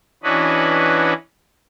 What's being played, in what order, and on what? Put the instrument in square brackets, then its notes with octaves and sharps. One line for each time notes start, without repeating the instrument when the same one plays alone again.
[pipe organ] E3 C#4 D4 F#4 B4 D#5